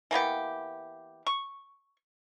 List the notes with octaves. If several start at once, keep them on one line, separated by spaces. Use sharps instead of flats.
E3 A#3 B3 G4
C#6